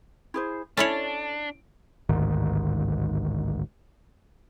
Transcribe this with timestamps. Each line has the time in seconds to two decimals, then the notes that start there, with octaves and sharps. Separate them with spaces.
0.34 E4 G#4 C5
0.77 C#4 D4 E4 A4 C#5
2.09 A1 D2 G#2 D#3